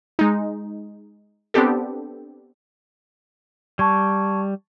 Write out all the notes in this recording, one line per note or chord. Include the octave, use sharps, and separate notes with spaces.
G#3 D#4
B3 C4 D4 G4 A4
G3 A5 C#6 G#6